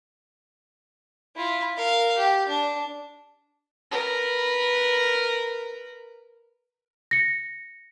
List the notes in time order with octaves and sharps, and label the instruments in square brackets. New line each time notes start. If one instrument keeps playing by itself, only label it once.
[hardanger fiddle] E4 F4
A#4 F5
G4
D4
A#4 B4
[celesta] A#6 C#7